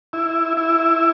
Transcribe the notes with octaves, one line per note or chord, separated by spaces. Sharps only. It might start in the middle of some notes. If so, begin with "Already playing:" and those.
E4
E4